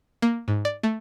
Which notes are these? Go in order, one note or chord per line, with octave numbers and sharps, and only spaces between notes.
A#3
G#2
D5
A3